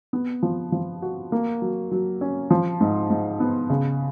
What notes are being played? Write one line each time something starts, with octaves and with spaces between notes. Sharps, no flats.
B3
F3
F3
F#4
A#3
F#3
F#3
C#4
F3
G#2
G#2
B3
C#3